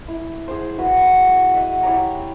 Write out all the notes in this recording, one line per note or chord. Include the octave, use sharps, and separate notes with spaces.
E4
G#4 C5
E4 F#4 B4
D#5 E5 F#5
E4 G4 C#5 A#5